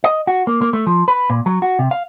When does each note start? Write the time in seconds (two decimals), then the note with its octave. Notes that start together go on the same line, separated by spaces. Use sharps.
0.04 D#5
0.27 F#4
0.47 A#3
0.62 A#3
0.73 A3
0.87 F3
1.08 B4
1.30 A#2
1.46 F#3
1.62 F#4
1.79 C3
1.91 F5